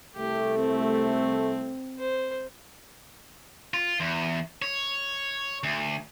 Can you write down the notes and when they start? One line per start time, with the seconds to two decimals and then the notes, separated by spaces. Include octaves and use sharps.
0.16 C2 A3 G4
0.59 C4
1.99 C5
3.74 F4
4.00 E2
4.62 C#5
5.63 D2